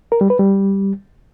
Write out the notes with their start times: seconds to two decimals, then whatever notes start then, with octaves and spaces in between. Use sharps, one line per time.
0.12 A#4
0.21 G3
0.30 B4
0.39 G3